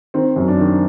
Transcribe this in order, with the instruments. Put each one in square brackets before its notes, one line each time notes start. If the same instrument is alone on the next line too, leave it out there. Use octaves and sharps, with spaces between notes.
[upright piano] D#3 C4
F#2
D4
D#3